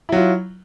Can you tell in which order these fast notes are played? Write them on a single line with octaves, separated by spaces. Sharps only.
E4 F#3 F4